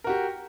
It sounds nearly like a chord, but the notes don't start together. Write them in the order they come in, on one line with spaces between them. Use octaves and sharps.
A#4 F#4 G4